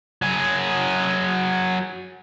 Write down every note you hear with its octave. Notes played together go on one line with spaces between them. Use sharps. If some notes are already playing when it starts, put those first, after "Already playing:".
F#3 G#4